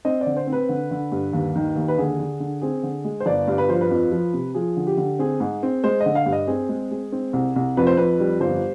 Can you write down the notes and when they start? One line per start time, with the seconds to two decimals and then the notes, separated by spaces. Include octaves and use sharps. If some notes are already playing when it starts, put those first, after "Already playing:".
0.05 C4 D#5
0.21 D5
0.26 D3
0.37 C5
0.47 C4
0.53 B4
0.69 D3
0.91 D3
1.12 G2
1.33 D#2
1.56 D#3
1.76 D#2
1.88 B4
1.98 D3 G#4
2.19 D3
2.40 D3
2.62 C4 G#4
2.83 D3
3.04 G#3
3.20 C5
3.26 G1 D5
3.48 G2
3.58 B4
3.69 F3 C5
3.81 B4
3.91 F2
4.12 F3
4.34 C3
4.55 F3 G#4
4.77 D3
4.87 G4
4.97 D3
5.19 C4 G#4
5.40 G#2
5.63 C4
5.84 G#3 C5
6.00 D#5
6.06 D3
6.15 F5
6.26 G2
6.32 D#5
6.47 C4 G#4
6.69 G#3
6.91 G#3
7.12 C4
7.33 C2
7.56 C2
7.77 F2 B4
7.87 C5
7.97 F2 B4
8.20 G3
8.41 G1 C5